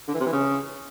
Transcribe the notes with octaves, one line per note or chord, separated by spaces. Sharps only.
D3
E3
C3
E3
C#3